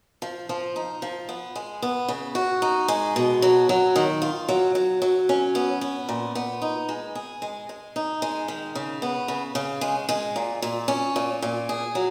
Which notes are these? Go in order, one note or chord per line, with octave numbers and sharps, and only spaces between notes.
F3
F3
D#4
F3
B3
G#3
B3
C#3
F#4
D#4
G#3
B2
F#3
F#3
D#3
F4
F#3
F#3
F#3
C#4
B3
B3
A#2
B3
D#4
G#3
G#4
G#3
G#3
D#4
G#3
D#3
C#3
B3
C#3
C#3
G#3
G#3
A#2
A#2
C#4
A#2
A#2
G#4
F#3